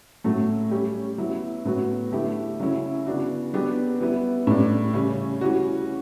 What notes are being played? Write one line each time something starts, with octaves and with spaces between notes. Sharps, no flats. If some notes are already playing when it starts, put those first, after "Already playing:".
A2 F#3 A3
G3 C#4 G4
F#3 B3 E4
A2 F#3 B3 F#4
D3 A3 E4 G4
C#3 F#3 C#4 E4
C#3 E3 B3 D4 F#4
F#3 B3 D4 G4
E3 G3 B3 E4
A2 G3 D4
C#3 G3 C#4
E3 G3 C#4 F#4